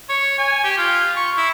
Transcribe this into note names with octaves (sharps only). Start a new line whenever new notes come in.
C#5
G#5
G4
F4
C#6
E4